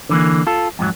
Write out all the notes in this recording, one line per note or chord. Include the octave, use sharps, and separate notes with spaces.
D3 E3 A#3
F4 A4
F2 G#2 F3 F#3